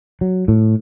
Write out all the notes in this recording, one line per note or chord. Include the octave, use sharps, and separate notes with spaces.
F#3
A2